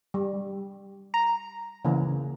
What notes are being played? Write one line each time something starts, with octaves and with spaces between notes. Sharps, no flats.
G3
A#5
C#3 E3 A#3